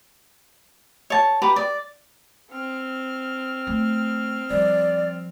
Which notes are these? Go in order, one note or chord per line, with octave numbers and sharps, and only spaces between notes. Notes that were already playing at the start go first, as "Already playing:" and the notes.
C#5 A5
G4 B4 A#5 D6
D5
C4 F6
A3
F3 G3 D5